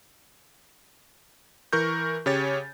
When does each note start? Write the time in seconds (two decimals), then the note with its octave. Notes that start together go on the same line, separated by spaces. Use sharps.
1.73 E3 A#4 C#6 G6
2.26 C#3 G4 C#5 A6